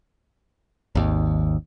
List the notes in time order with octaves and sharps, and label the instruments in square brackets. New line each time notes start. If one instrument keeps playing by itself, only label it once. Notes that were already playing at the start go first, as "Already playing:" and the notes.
[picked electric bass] G#1 D#2